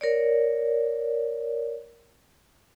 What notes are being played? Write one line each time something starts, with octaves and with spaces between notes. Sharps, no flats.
A#4 C#5 D5